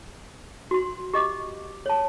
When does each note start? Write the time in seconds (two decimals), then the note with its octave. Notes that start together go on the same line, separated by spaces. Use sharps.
0.71 F#4 C6
1.14 G4 D#5 D6
1.86 C#5 A5